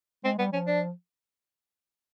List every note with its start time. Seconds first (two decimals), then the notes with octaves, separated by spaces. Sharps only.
0.24 G#3 C4
0.38 G3 B3
0.52 F3 C#4
0.67 D4